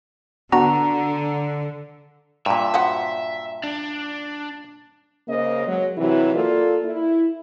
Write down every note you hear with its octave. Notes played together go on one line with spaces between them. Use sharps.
D3 B3 D4 F#4 A#5
G2 A#2 E5
F3 F#3 F#5
D4
C#3 A#3 C5 D#5
F#3 G#3
C3 E3 F#3 E4
A#3 F4 A4 D5
E4